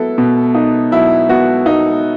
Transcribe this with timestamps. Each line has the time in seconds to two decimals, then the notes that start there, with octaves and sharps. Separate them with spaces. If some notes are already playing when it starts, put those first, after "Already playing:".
Already playing: F#3 B3 E4 A4
0.18 B2
0.55 D#4
0.92 F#3 E4
1.29 B3 F#4
1.65 B2 D#4